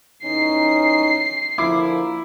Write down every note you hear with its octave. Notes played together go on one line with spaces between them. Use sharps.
E2 C#4 D#4 C7
D3 F3 A#3 E4 D6